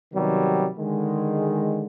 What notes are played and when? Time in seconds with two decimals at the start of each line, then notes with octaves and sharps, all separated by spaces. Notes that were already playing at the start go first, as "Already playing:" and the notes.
0.14 C3 D#3 F#3 G3 B3
0.78 D3 D#3 G#3